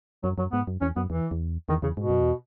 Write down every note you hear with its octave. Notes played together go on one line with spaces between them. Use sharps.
F#2 F#3
F#2 F#3
G#2 B3
F#2
E2 C#4
F#2 B3
E2 E3
E2
E2 D#3
E2 C#3
G#2 B2
F#2
E2